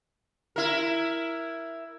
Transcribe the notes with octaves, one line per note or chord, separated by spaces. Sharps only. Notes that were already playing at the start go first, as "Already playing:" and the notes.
E4 A#4